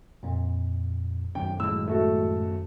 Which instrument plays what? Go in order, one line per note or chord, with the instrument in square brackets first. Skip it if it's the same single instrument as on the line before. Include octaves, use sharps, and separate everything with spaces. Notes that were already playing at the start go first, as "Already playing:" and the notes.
[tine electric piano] F2 A#2
[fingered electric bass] F#2 D#3 C#4 [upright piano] G5
[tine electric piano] A2 G#3 [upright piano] E6
[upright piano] A3 F#4 A4